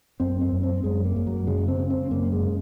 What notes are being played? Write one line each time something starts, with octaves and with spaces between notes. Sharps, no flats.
F#2 C4
C4
F#2
C4
F#2 G#3
A#3
F#2
F#3
C#3 G#3
C4
C#3
C4
F#2 A#3
G#3
C#3